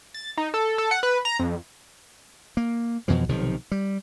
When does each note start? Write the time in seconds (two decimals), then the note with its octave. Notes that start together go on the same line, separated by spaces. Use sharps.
0.14 A6
0.37 D#4
0.54 A4
0.78 A4
0.91 F#5
1.03 B4
1.25 A#5
1.39 F2
2.57 A#3
3.08 F2 B2 E3 F3
3.29 B1 C3 D#3 F3
3.72 G3